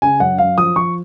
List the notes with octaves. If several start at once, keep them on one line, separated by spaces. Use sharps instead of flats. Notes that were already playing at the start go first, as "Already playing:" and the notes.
C#3 G#5
F#2 F#5
F#2 F5
F3 D#6
F3 C#6